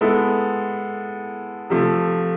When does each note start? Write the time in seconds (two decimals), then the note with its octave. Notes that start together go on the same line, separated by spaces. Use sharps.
0.01 G#3 B3 E4 A4
1.70 C3 F3 A3